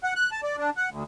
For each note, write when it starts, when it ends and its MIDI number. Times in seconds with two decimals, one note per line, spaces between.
0.04 0.14 78
0.16 0.30 90
0.32 0.41 81
0.43 0.56 74
0.58 0.70 62
0.77 0.90 78
0.91 1.04 38